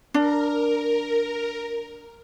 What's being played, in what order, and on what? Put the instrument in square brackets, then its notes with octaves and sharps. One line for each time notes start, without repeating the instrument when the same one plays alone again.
[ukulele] D4 [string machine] A#4